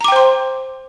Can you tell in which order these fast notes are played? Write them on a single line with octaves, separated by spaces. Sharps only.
A#5 D6 G5 C5 C6